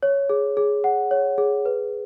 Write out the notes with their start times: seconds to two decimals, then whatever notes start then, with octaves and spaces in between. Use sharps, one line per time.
0.03 C#5
0.29 G#4
0.57 G#4
0.84 F#5
1.11 C#5
1.38 G#4
1.65 B4